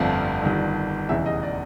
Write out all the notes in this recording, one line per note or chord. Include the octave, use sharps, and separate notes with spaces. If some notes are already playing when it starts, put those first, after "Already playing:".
Already playing: G1 F2 D3 F3 A3 F5
G1 G2 D#3
F1 E2 C#3 E3 E5
D#5
D5